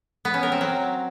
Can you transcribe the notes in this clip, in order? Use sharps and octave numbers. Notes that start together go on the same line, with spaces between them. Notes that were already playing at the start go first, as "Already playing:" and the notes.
B3
C#4
A#4
C4
F#3